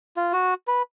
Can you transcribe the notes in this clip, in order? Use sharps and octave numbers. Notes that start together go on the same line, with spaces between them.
F4
F#4
B4